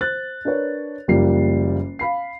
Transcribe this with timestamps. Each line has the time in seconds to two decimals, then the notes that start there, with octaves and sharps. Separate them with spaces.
0.01 C5 F#6 A6
0.45 D4 A#4 B4 C#5
1.08 F#1 F3 G3 A#3 C7
1.99 F5 B5 C7